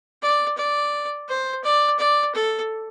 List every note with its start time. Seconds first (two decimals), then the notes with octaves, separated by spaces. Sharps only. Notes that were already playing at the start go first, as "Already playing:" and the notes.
0.22 D5
0.57 D5
1.29 C5
1.64 D5
1.99 D5
2.35 A4